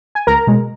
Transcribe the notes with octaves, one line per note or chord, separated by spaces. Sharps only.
G#5
C#2 A#4 A#5
B2 G#3